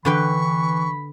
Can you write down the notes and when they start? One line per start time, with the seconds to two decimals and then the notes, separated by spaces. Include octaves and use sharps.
0.05 D3 E3 B4 G5 B5 C#6